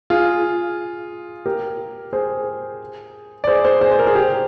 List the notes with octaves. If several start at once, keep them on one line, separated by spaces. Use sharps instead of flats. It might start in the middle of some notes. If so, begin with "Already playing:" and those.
F4 G#4
G4 A#4
G#4 C5
D5
G#4 C5
G#4 C5
G#4 C5
C5
A#4
G#4
G4